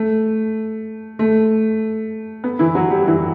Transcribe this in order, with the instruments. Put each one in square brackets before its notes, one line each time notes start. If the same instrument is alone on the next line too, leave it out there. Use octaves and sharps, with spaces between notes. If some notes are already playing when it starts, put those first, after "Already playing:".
Already playing: [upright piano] A3
A3
B3
E3 E4
F#3 F#4
G3 G4
E3 E4